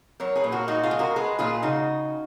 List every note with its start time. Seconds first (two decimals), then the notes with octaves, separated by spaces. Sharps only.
0.20 F#3 A#4 C#5
0.36 G#4 B4
0.44 A#2
0.52 F#4 A#4
0.68 G#3 D#4 F#4
0.83 F4 G#4
0.91 G#3
0.99 F#4 A#4
1.16 G#3 G#4 B4
1.39 A#2 F4 G#4
1.62 C#3 D#4 F#4